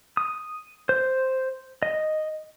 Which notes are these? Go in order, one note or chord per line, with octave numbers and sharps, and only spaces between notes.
D#6
C5
D#5